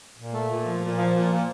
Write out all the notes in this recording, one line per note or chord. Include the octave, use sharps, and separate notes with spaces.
A#2
A3
A#2
F3
A#2
F3
A#2
A#2